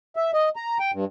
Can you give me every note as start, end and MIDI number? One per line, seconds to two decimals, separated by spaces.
0.16 0.31 76
0.34 0.49 75
0.56 0.77 82
0.80 0.91 79
0.93 1.05 43